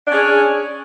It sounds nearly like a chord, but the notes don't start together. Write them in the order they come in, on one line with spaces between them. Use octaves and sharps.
D4 C#4 G#4